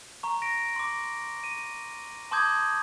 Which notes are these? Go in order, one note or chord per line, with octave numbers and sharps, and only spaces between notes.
A#5 C#6
A#6 D7
C6 D6
D#7
A5 C6 D6 D#6 G6 G#6